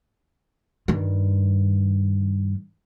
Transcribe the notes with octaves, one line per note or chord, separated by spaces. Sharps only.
G2 D#3